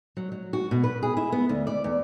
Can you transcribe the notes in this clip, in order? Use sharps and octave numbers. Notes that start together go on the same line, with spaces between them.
F#3
F#3
F#4
B2
B4
G#4
E4
B3
D2
D5
E2